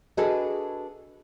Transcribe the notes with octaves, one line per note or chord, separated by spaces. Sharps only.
D4 F#4 G#4 A4 B4 D#5